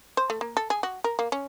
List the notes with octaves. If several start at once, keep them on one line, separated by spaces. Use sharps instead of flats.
C5
A3
A#3
A4
G#4
F#4
A#4
A#3
C#4